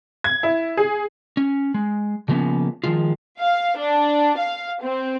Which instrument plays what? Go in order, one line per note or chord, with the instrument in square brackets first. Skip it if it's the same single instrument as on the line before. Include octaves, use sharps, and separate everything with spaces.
[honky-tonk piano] G#6
E4
G#4
[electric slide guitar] C#4
G#3
C#3 F3 A#3 B3 C#4
D#3 F3 G#3 F4
[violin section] F5
D4
F5
C4